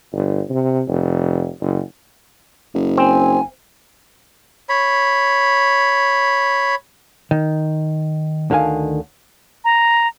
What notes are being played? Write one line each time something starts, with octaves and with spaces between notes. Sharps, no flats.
G1
C3
F1
F#1
F#1
C4 G#5
C#5 B5
D#3
D2 D3 D#3 F5 G#5
A#5